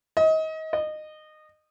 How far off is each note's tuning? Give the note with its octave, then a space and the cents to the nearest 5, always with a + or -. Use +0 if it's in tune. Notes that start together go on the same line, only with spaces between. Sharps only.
D#5 +30
D#5 -20